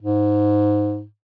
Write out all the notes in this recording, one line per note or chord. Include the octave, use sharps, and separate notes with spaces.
G#2